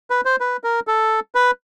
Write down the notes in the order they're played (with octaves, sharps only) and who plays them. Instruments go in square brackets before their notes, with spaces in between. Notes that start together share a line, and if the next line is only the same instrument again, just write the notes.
[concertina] B4
C5
B4
A#4
A4
B4